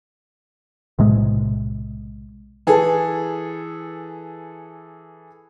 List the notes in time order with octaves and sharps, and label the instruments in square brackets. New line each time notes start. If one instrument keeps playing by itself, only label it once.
[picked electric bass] B1 A2 C3 G#3
[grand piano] E3 G#4 A4